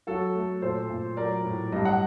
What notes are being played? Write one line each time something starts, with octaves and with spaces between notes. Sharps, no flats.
F#3 F#4 A4
A3
A#2 A4 C5
A#2
F#3 A#4 D5
A2
G2 D#5
F#5